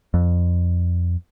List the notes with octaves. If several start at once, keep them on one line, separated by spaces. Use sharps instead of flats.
F2